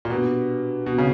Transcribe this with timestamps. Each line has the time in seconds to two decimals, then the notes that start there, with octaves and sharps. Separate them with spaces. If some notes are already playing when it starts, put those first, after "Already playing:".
0.05 A#2
0.10 B2 D4 G4 B4
0.86 B2
0.98 C#3